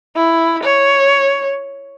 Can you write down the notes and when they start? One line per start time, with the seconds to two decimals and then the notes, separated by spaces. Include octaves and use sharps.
0.15 E4
0.64 C#5